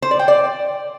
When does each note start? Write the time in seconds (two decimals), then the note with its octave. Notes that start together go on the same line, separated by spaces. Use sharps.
0.02 C5
0.11 D5
0.19 G5
0.28 D5